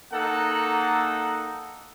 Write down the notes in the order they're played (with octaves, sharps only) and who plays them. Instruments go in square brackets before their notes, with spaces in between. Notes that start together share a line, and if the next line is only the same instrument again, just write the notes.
[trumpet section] A#3 D#4 A4 F#5